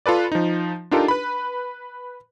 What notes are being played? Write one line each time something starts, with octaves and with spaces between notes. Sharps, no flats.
F4 A4 B4 D5
F3 D#4
D4 D#4 F4 G4 A4 A#4
B4 B5